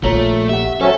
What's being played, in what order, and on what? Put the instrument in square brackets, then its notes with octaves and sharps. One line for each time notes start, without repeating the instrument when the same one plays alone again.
[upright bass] A#1 [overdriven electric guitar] A3 [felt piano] F4 C#5 A#5
[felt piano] G4 F#5 [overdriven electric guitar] E5
[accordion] F#3 C#4 [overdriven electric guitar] A4 [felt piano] C5 E5 F#5